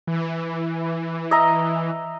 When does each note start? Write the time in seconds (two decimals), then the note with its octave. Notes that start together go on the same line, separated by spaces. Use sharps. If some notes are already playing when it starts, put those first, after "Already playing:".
0.07 E3
1.31 D#5 E5 A#5